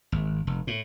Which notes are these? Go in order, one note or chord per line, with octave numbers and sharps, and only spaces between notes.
G#1
F1
A2